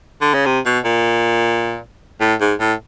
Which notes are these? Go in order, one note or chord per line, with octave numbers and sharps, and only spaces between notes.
D3
C#3
C3
B2
A#2
A2
G#2
A2